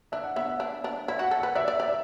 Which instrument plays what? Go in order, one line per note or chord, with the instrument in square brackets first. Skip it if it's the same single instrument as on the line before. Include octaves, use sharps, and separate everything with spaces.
[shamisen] D4 [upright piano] E5
[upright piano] F#5
[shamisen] B3 [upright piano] E5
[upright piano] E5
[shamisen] D4
D4
[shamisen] E4 [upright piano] E5
[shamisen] F#4 [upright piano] F#5
[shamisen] A4
[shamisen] B4 [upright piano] F#5
[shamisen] D5 [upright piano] E5
[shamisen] D5
[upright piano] E5
[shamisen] D5
[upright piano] E5